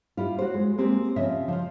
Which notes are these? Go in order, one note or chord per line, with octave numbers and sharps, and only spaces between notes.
G3 E4 F4
F#4 C5
G#3
G#3 A#3 C4 G4
C#3 F3 D#5 E5
F3 F4